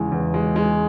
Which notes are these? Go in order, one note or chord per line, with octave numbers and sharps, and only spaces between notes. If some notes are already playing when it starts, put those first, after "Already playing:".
Already playing: E2 C#3 E3 G#3
E2
G#3
G#3